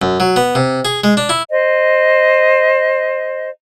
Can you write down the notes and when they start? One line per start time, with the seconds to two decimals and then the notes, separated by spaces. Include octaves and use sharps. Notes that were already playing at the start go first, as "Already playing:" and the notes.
0.02 F#2
0.20 F#3
0.36 B3
0.55 C3
0.85 G#4
1.04 G#3
1.17 D4
1.29 E4
1.50 C5 D#5